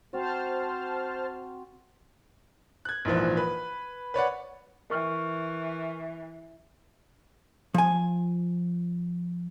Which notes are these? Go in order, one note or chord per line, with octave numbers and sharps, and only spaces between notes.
C4 F#4 C5 A5 F6
F#6 G#6
A#1 G#2 E3 F3
B4
B4 C#5 D5 F#5
E3 A#4 C#6 F6
F3 G#5